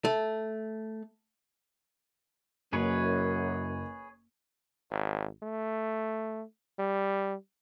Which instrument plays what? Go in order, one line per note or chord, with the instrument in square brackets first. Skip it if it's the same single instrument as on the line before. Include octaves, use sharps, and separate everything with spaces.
[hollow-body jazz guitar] A3
[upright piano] F#1 [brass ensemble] F#2 [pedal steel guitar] G#4 B4 C#5
[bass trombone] G#1
A3
G3